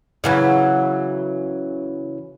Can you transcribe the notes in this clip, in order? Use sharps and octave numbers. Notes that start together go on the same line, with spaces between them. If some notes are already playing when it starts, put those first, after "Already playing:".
C#3 E3 F#3